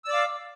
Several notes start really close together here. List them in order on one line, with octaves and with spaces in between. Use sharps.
E6 D5 D6 F5